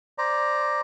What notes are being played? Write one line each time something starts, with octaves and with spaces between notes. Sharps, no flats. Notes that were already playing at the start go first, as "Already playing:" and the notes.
C5 D5 A#5